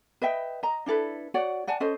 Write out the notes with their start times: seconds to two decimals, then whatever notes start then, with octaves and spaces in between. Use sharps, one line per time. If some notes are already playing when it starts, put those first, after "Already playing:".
0.22 B4 D#5 E5 G5
0.63 D#5 A#5
0.86 D4 E4 A4 B4
1.34 F#4 C#5 D5 F#5
1.67 D5 F#5 G#5 A5
1.80 C#4 A4 C5 D#5